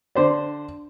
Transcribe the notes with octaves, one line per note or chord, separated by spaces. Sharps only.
D3 C5 D5